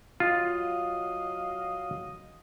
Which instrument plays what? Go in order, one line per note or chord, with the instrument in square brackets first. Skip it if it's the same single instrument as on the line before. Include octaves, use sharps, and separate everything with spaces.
[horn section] F#3 D#5 F5 [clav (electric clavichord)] F4